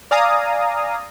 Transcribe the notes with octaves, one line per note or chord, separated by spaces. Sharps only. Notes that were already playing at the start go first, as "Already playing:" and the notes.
D5 F5 G#5 A#5 D#6